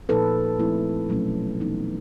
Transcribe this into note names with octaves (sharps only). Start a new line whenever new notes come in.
A#2 F3 A#3 D#4 A4 B4
F3 A3 C4 E4
B2 F#3 A3 C#4
E3 G3 B3 D#4